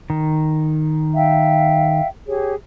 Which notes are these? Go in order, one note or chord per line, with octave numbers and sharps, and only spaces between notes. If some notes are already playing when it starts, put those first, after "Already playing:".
D#3
E5 F5 G5
G4 G#4 C#5